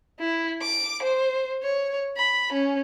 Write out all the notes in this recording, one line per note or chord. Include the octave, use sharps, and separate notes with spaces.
E4
D6
C5
C#5
B5
C#4